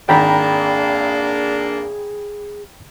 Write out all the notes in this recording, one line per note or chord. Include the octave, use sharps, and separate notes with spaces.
G#1 A#3 D4 G#4 G5 A#5 B5